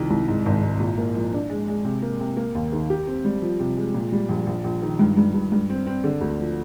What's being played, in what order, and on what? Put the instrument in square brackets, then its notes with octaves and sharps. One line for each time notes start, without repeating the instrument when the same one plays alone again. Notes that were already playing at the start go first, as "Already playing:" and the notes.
Already playing: [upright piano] C2 D#3 F3
C2
G#2
G#1
G#2
A#2
A#3
F3
D4
G#3
G#3
C3
A#3
C3
A#3
D#2
D#3
G4
C4
G3
F3
C3
G#3
A#2
G3
A#1
A#1
A#1
D#3
G2
G2
G2
G2
C4
C4
D3
D2
F3